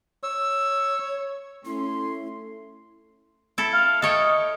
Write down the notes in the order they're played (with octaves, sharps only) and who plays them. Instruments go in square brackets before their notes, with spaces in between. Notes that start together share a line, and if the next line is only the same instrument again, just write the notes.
[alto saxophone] C#5 [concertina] E6
[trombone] A3 [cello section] C#4 [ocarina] E4 [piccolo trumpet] C6
[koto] E4 A4
[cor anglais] F5
[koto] A4 C#5 G5 [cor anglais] D#5